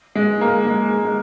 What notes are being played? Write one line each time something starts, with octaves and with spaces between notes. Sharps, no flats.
G#3
A#3
G#3
G#3